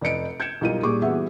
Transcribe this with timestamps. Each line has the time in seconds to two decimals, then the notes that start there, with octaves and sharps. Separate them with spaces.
0.01 F1 D5 D#5 C#7 D7
0.40 G6 G#6 C#7 E7
0.61 B1 G3 F4 A#4 D#7
0.83 A#2 G3 G#4 C#6 D6
1.02 E3 G3 B3 F#4 G#4 E5